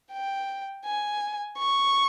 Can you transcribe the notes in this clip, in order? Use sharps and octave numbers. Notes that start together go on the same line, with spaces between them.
G5
G#5
C#6